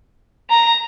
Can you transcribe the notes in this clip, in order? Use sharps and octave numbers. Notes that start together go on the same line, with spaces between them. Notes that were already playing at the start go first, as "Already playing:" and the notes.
A#5